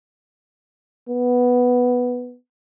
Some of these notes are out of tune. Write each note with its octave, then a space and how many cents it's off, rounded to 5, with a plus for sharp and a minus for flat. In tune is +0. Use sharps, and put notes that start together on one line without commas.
B3 +0